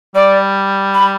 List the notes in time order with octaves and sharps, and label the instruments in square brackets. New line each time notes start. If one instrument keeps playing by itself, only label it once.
[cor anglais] G3 [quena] D5
[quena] B5